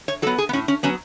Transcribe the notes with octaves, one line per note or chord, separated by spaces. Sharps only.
C#5
F#3 B3 A4
G#4
B3
A2 C#4
C#4
F#3 B3 C#4